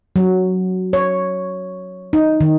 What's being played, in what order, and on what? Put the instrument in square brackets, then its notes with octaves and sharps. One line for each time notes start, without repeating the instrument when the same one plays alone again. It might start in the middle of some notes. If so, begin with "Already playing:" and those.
[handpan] F#3
C#5
D#4
D#3